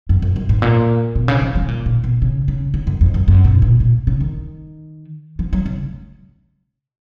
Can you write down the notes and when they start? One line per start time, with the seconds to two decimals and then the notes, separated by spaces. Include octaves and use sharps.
0.09 F#2
0.22 F2
0.36 F#2
0.49 G#2
0.62 A#2
1.16 B2
1.28 C#3
1.41 F3
1.55 F3
1.62 B2
1.68 A#2
1.86 A#2
2.04 B2
2.22 C#3
2.48 C#3
2.74 C#3
2.87 F#2
3.01 F2
3.14 F#2
3.28 F#2
3.44 B2
3.62 A#2
3.80 A#2
4.07 C#3
4.21 D#3
5.39 F3
5.53 F#3
5.66 C#3